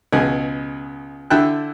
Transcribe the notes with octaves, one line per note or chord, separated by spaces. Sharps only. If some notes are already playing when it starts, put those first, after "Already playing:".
C#2 B2 G#3 G#4
D3 E4 G5 A5 F#6